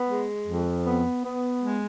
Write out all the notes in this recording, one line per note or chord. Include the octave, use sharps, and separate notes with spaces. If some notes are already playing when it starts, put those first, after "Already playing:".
Already playing: B3
G#3
F2
B3
B3
G#3